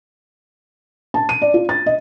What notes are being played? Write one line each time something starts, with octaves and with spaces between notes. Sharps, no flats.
A5
D#7
D5
F4
A6
D#5